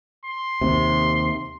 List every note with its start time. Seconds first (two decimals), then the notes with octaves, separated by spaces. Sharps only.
0.25 C6
0.61 D#2 C3